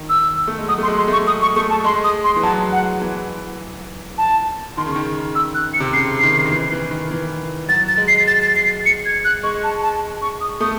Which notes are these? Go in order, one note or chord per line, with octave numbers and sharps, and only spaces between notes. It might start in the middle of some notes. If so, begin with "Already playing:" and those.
Already playing: D#3
E6
A3
G#3
F#3 D#6
A3 C6
G#3
C6
A3 C#6
G#3 D#6
C#6
A3 C#6
A5
G#3 C6
D#6
C6
E3
F#3 A5
F#5
E3
A5
D#3 C6
C#3
C#6
D#3
E6
F#6
C#7
C3
C#3 C7
D#3
D#3
E3
E3
D#3
E3
F#3 A6
A6
G#3
C7
A6
A6
C7
C#7
G#6
F#6
G#3 C#6
A5
A5
C#6
D#6
A3 D#6